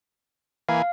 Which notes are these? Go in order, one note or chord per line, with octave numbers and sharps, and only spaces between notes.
E3 A#3 F5 G#5